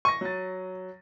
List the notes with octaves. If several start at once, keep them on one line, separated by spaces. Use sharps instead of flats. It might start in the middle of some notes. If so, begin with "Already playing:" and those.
C#6 A#6 D#7
F#3 A6